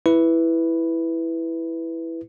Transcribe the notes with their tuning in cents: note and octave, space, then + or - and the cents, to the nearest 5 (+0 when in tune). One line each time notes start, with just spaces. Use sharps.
E4 +0 B4 +0